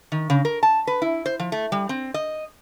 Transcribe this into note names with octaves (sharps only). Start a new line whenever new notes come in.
D#3
C#3
A#4
A5
B4
E4
C5
F3
A3
G3
C4
D#5